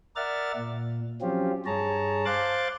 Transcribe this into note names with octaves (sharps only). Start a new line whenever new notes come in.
A#4 D5 E5 F#5 F6 A6
A#2
F3 F#3 C4 C#4 F4 G4
G2 G#4 C#5 A5 A#5
C5 F5 C6 D6 F#6 A6